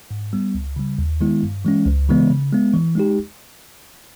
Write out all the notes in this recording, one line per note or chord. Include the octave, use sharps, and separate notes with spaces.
G#2
G3 B3
C#2
C#3 G3
D#2
D#3 G#3 B3 E4
G2
E3 G#3 C#4
C#2
C#3 E3 G#3 B3
C#3
G#3 B3
E3
G#3 D#4 G4